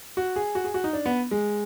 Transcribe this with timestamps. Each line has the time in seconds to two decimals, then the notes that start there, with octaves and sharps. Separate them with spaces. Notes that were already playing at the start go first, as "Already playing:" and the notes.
0.17 F#4
0.36 G#4
0.55 F#4
0.65 G#4
0.74 F#4
0.84 D#4
0.93 D4
1.06 B3
1.31 G#3